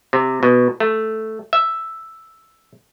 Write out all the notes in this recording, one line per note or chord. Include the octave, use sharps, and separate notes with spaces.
C3
B2
A3
E5